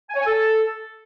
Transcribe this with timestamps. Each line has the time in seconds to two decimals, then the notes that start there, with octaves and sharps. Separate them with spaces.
0.09 G#5
0.15 C#5
0.21 G#5
0.26 A4